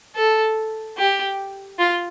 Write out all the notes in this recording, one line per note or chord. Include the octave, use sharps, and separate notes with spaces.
A4
G4
F4